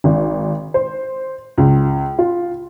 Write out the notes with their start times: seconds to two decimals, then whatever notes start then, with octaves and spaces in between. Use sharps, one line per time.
0.04 G#1
0.74 C5
1.58 C#2
2.19 F4